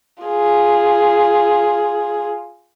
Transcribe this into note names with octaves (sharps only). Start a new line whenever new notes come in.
F4 G#4